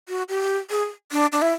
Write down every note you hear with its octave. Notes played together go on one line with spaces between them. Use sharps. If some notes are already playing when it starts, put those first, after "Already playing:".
F#4
G4
G#4
D4
D4
E4